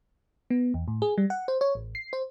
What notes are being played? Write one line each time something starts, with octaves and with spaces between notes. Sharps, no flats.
B3
E2
A2
G#4
G3
F#5
C5
C#5
A1
C7
C5